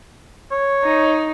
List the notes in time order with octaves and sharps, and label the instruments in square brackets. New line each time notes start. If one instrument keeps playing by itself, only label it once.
[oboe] C#5
[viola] D#4